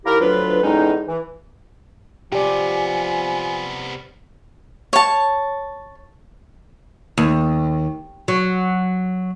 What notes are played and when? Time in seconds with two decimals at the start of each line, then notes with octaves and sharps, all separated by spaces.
0.06 D#2 A#3 E4 G4 A#4
0.21 D2 F3 F#3 D4 F4 B4
0.63 E2 A2 G#3 C#4 D#4
1.08 E3
2.32 C3 F3 B3 G4 D5 G#5
4.93 C#5 A5
7.18 D#2
8.28 F#3